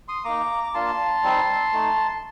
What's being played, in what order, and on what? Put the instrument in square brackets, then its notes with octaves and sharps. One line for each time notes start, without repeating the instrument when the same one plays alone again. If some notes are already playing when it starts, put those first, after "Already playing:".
[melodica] C6 D#6
A#3 D#4 A#5 D6
D6
A#3 D4 F4 A5 C6
G3 C4 D#4
A3 D#4